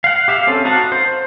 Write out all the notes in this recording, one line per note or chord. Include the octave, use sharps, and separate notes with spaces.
F5 F#5
G4 E5 F5
C4 C#4 A4
D#4 F#4 F5 F#5 A5
C5